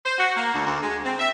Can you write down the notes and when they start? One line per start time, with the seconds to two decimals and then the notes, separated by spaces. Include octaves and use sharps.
0.06 C5
0.18 F#4
0.37 A#3
0.54 D2
0.66 D2
0.83 G#3
1.05 C4
1.20 E5